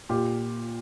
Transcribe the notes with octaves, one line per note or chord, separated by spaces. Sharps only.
A#2 F4 G4